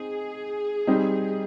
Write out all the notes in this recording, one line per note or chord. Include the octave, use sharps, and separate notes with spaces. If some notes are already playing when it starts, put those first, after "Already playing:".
Already playing: C4 D#4 G#4
G3 C4 D#4